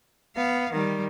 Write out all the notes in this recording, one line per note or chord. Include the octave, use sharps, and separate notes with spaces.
B3 F5
D#3 G3